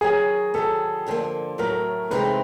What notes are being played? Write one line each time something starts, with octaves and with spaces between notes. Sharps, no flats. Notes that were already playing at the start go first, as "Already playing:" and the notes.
D#3 F#3 B3 G#4
D#3 F#3 B3 A4
G2 D3 F3 A#3
A2 F#3 A3 A#4
C3 E3 G#3 C4 D#4 B4